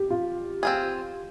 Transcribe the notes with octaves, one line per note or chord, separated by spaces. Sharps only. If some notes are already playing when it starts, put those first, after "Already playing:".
Already playing: G4
F4
C4 F4 G#4